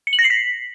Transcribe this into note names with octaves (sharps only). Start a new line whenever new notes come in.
C#7
F#7
A#6
C7
B6